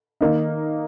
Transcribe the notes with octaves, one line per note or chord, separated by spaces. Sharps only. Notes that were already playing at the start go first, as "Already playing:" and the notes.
D#3 A#3 D#4